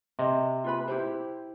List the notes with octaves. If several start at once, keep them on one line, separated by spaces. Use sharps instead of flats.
C3 D#5
F4 B4 B5
E4 G4 C5